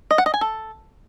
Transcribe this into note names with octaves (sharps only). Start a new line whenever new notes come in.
D#5
F#5
D#5
G#5
A4